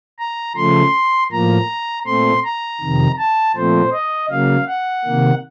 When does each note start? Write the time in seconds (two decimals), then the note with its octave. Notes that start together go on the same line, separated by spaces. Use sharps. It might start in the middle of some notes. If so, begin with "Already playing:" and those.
0.19 A#5
0.56 C#3 F3 A3 C6
1.32 A2 F3 A#3 A#5
2.06 A#2 A3 C4 C6
2.44 A#5
2.81 F2 C3 D#3
3.18 A5
3.56 A#2 F3 A3 C4 C5
3.93 D#5
4.31 C#3 F#3 A#3 F5
4.68 F#5
5.05 C3 D#3 A#3